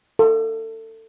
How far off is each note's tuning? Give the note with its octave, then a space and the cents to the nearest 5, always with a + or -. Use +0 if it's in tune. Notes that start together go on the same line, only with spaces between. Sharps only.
A4 +25